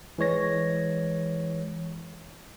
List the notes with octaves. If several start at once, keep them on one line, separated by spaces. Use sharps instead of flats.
E3 G#3 C#5 A#6